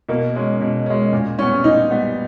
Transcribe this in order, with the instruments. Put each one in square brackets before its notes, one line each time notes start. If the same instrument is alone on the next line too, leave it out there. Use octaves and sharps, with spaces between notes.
[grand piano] B2 [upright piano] A#3
[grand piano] G#3 C#4
B2
G#3 C#4
A#2
[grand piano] G3 B3 [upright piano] C#4
[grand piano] A#2 [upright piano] D#4
[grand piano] G3 B3